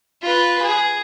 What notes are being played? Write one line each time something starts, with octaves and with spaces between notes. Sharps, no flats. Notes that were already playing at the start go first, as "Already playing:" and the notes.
F4 B4
G#4